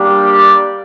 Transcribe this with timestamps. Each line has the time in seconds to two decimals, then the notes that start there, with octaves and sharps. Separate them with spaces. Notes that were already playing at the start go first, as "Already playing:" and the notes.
Already playing: G3 A#3 D4 G4
0.28 D5